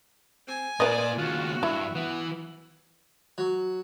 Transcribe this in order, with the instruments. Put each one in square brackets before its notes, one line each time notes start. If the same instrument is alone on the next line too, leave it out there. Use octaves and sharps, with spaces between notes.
[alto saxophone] C4 [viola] G#5
[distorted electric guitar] A#2 [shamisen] A#4 B4 D#5 [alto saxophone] D5
[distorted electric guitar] D#2 C#3 [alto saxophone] F4 [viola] F#4
[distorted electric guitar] G2 [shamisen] E4 [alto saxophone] E5
[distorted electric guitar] E3 [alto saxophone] B3
[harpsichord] F#3